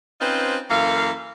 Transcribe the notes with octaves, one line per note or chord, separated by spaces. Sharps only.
C4 C#4 D#4 F4 B4 C5
F#2 E3 A#3 A4 F5